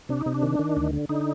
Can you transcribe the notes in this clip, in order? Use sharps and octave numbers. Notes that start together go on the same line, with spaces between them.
C3 D4
D#4
C3
D4
D#3
D#3
D2
D3
D3 D#4